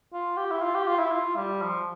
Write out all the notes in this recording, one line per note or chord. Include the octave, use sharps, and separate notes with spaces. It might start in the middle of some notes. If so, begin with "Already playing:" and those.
F4
G4
E4
F4
G4
F4
E4
F4
G3
F3